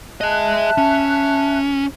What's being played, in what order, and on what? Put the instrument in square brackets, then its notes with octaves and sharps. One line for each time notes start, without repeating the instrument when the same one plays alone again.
[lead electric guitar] G#4 D#5 [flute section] E5 A5 F#6
[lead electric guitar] C#4